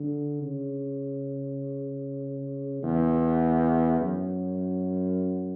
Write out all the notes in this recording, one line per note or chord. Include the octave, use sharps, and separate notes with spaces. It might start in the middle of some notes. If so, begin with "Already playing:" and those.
Already playing: D3
C#3
E2
F#2